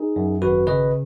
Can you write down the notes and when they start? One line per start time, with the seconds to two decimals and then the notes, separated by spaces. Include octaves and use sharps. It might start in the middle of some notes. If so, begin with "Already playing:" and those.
Already playing: D#4 G#4
0.16 F#2
0.42 G#1 F#4 B4
0.67 C#3 B4 D#5